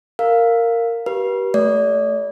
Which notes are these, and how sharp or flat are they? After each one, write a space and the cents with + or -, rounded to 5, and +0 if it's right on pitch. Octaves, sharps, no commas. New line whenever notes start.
A#4 -15 F5 +0
G4 -30 B4 -40
A3 +0 D5 -40